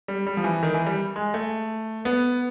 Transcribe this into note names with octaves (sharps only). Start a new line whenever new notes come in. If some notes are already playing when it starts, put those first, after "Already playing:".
G3
G3
F3
E3
D#3
E3
G3
G#3
A3
B3